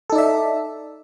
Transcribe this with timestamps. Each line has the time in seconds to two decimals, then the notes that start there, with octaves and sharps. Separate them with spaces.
0.10 A4
0.12 D#4
0.15 D5
0.18 E5